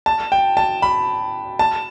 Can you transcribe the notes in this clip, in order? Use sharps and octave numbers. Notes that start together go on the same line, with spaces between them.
A5
G5
A5
B5
A5